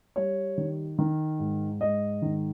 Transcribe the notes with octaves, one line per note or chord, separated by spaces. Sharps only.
G3 C#5
D#3
D#3
G#2
G#2 D#5
D#3